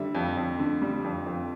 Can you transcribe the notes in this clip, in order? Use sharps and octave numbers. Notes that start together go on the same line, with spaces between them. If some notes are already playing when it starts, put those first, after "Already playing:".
Already playing: D3 G3 E5
F2
F2
D3
G3
F2
F2